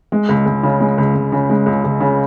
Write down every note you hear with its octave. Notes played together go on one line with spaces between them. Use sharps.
G#3
C#2
C#2
C#3
G#3
C#2
C#2
C#3
G#3
C#2
C#2
C#3